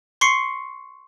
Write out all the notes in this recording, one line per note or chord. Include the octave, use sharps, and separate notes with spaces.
C6 C#6 C7 C#7